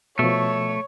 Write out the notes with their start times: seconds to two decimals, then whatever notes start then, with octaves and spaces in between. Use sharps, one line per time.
0.19 B2 F3 A3 C#5